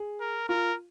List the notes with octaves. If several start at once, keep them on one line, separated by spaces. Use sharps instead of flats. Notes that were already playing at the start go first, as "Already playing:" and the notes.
Already playing: G#4
A#4
F4 A#4